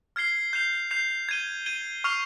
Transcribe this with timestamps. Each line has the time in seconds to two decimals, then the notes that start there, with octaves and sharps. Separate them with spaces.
0.16 F6 G#6 C7 G7
0.53 G6 C7 F7
0.91 G6 C7 F7
1.29 G#6 D#7 G7
1.66 G#6 D#7 G7
2.04 C#6 F6 C7 F7